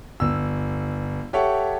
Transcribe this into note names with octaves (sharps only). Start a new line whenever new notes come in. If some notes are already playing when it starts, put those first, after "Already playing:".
G1 E6
G4 A4 C#5 E5 F#5